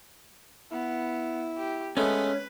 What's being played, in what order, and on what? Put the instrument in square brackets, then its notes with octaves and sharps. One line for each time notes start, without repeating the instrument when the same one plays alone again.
[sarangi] B3 [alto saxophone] E4
[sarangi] G4
[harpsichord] G#3 A3 B3 [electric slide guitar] C#4 [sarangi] B4